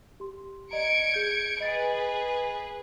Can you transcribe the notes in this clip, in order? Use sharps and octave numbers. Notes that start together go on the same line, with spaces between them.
G4 C6
D5 D#5 A#5 G#6 C#7 D7
G#4 G6
G#4 B4 D#5 A6